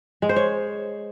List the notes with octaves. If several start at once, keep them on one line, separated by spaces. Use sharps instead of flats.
G#3
C5
C#5